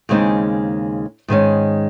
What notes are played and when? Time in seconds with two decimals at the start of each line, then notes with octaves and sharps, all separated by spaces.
0.09 D#2 C#3 G#3 C4 D#4
1.28 G#2 D#3 G#3 C#4